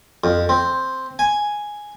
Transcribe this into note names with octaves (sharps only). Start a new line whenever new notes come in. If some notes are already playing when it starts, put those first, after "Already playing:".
F2
C4
G#5